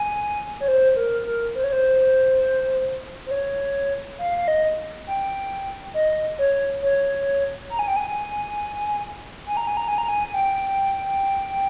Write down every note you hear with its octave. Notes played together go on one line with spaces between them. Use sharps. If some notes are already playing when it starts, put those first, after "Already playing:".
Already playing: G#5
C#5
C5
A#4
A#4
C5
C#5
C5
C5
C#5
F5
F5
D#5
G5
D#5
C#5
C#5
A#5
G#5
G5
G#5
G#5
A#5
G#5
A#5
G#5
A#5
G#5
G#5
G5